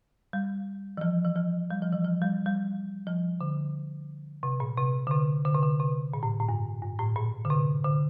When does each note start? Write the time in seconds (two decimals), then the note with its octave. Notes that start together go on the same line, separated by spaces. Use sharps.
0.33 G3
0.97 E3
1.01 F3
1.24 E3
1.36 F3
1.71 G3
1.82 F3
1.93 E3
2.04 F3
2.22 G3
2.46 G3
3.07 F3
3.41 D3
4.43 C3
4.60 A#2
4.77 C3
5.07 D3
5.11 C3
5.45 D3
5.55 C3
5.63 D3
5.79 C3
6.14 A#2
6.23 A2
6.40 A2
6.49 G2
6.82 G2
6.99 A2
7.16 A#2
7.45 D3
7.50 C3
7.85 D3